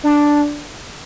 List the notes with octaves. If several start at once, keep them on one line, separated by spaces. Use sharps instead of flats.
D4